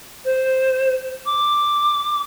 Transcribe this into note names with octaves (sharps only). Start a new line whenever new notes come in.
C5
D6